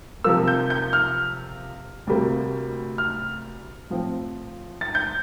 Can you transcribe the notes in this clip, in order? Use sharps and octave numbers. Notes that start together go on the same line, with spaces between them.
C3 F3 A#3 E6
G6
G6
F6
D2 C3 G3 A#3
F6
A2 F3 C4
A6
G6